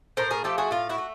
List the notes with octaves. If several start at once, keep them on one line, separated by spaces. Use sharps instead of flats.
A2 A#4 C5
G#4 A#4
F3 A3 G4 A4
F#4 G#4
A2 F4
E4 F#4
A3